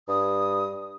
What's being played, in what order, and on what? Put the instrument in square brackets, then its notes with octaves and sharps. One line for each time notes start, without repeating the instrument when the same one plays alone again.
[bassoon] G2 [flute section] D#6